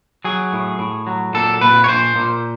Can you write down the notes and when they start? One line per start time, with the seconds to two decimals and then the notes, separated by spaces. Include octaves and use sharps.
0.24 F#3 G#4
0.53 A2
0.79 A2
1.07 F#3
1.34 A#2 A4
1.61 A#2 B4
1.84 C#5
1.89 A#2 C5
2.16 A#2